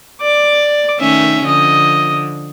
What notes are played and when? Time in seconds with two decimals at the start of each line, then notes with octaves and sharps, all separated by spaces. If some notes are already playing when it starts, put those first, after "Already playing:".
0.21 D5 D6
1.00 D#3 A3 C#4 E5
1.46 D3 F3 D#5